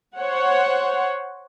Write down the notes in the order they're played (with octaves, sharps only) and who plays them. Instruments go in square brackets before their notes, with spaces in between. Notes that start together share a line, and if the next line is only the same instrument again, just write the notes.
[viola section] C5 C#5 F#5